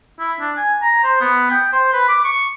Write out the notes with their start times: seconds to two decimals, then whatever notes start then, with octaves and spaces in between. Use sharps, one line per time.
0.19 E4
0.40 D4
0.57 G#5
0.82 A#5
1.03 C5
1.21 B3
1.51 G5
1.73 C5
1.93 B4
2.09 D6
2.24 C#6